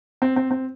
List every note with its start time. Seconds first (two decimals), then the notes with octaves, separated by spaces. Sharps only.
0.22 C4
0.36 C4
0.51 C4